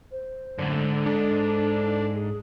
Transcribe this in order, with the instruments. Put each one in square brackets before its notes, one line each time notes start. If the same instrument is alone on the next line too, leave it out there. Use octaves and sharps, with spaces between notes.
[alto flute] C5
[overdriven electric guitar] F#2 A2 [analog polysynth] D3
[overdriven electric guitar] G#2
[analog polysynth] D4 [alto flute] A4
[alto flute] G#4